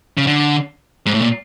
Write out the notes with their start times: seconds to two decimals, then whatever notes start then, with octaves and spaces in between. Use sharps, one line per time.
0.17 C#3
0.27 D3
1.06 G#2
1.14 A2
1.22 A#2